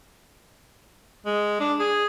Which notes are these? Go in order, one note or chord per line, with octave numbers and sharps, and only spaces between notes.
G#3
D4
G#4